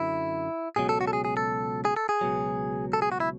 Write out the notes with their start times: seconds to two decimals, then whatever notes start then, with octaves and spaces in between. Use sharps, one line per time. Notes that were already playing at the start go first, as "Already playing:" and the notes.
Already playing: F#2 D3 F#3 E4
0.76 C#2 B2 F#3 G#4
0.89 A4
1.01 F#4
1.07 A4
1.13 G#4
1.25 G#4
1.37 A4
1.85 G#4
1.96 A4
2.09 G#4
2.21 C#2 B2 F#3
2.93 A4
3.02 G#4
3.12 F#4
3.20 E4